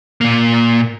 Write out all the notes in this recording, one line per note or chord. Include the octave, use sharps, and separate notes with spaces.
A#2 A#3